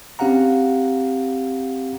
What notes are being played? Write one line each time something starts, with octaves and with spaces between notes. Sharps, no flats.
C4 C#4 G4 F5 F#5 A#5